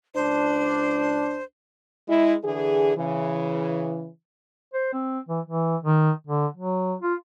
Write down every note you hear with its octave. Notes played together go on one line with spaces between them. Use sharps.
C#2 D4 C5
G#3 E4
D3 E3 G#4
C#3 E3
C5
C4
E3
E3
D#3
D3
F#3
F4